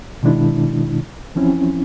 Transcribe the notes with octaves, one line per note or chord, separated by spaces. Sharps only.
B2 D#3 G#3 D4 E4
E3 F3 C4 C#4 E4